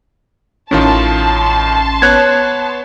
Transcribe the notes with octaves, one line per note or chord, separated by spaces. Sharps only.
A1 A2 D#3 C#4 F4 A5 C6
B3 C#5 F#6 G#6